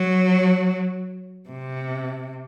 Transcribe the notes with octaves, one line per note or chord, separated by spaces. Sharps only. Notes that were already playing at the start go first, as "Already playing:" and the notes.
Already playing: F#3
C3